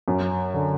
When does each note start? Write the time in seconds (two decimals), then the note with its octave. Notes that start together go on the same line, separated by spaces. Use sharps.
0.08 F#2
0.54 D3